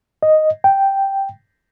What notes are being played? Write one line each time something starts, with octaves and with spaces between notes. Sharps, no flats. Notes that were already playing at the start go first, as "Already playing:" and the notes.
D#5
G5